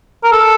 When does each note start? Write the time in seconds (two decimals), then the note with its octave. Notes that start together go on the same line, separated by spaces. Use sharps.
0.24 A#4
0.32 A4